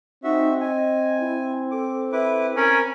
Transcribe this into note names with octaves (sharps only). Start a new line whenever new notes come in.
C4 D#4 F#4 E5
D#5 G#5
E4
A4 D6
E4 B4 D6
C#4 A#4 G#5 B5